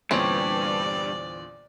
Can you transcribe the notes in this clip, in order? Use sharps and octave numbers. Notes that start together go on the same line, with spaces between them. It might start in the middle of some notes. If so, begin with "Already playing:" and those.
E2 G2 A#2 D3 C4 C#4 C#5 D5